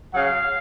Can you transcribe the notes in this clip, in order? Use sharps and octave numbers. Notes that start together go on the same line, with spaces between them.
C#3 F#3 C#4 F5